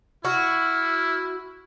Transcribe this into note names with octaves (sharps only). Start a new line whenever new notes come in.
E4 F#4 F6